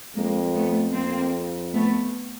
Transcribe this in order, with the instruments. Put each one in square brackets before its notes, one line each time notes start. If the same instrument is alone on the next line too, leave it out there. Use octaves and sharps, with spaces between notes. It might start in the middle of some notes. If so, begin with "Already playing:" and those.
[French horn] F2 [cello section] G#3 A#3
[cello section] A3 B3
[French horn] F2 [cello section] A#3 C4
[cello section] A3 B3